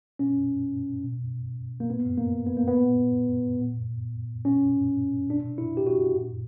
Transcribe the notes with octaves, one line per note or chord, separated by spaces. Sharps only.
B2 C#4
B2
A#3
A#2 B3
A#3
B3
A#3
B3
A#2
A#2
B2 C#4
B2 D4
E4
G4
F#4
A#2